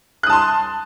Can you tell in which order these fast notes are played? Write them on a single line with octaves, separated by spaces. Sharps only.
F#6 D#6 A5 C6